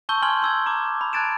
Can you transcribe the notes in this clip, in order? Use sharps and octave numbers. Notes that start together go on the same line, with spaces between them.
A5 C6 C#6 E6 G6 G7
G#5 C6 F6 G#6 F#7 G7
C6 E6 G#6
A#5 D6
B5
A5 F#6 G#6 A6 D7 E7